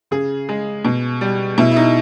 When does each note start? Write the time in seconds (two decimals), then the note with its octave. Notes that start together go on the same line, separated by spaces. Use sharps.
0.11 C#3 G#4
0.49 G#3
0.85 B2
1.21 G3
1.58 B2 E4
1.72 E4
1.76 D#4